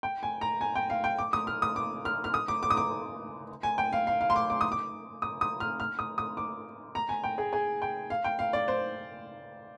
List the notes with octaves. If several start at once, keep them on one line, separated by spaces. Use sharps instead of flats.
G5
G#5
A#5
G#5
G5
F5
G5
D6
D#6
F6
D#6
D6
F6
F6
D#6
D6
D6
D#6
D6
G#5
G5
F5
F5
F5
C6
D6
D6
D#6
D6
D#6
D#6
F6
F6
D#6
D#6
D6
A#5
G#5
G5
G#4
G#4
G5
F5
G5
F5
D5
C5